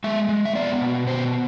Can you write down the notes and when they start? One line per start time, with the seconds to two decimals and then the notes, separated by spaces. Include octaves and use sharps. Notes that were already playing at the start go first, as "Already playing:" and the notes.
0.04 G#3 E5
0.29 G#3
0.45 E5
0.55 B3 D5
0.81 B2
1.07 B3 C5